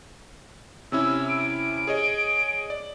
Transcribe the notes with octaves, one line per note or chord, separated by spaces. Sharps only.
C3 C#4 E4 E6
D7
G#4 C#5 D#5
D5